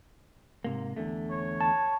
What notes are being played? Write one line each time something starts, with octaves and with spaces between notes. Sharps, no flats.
G#2 C3 A#3
E2 D3 A3
C#5
A5